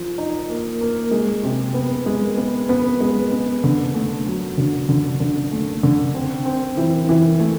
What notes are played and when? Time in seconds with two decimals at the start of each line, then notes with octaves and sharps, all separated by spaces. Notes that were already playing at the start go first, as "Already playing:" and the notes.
Already playing: F3
0.18 D#4
0.49 A#3
0.81 A#3
1.11 G#3
1.43 C3
1.74 B3
2.06 G#3
2.37 B3
2.69 B3
3.00 G#3
3.32 B3
3.64 D3
3.95 A3
4.26 F#3
4.58 D3
4.89 D3
5.20 D3
5.52 A3
5.83 D3
6.15 C4
6.45 C4
6.77 E3
7.09 E3
7.40 A3